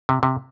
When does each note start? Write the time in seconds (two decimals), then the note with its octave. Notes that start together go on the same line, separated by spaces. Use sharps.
0.09 C3
0.23 C3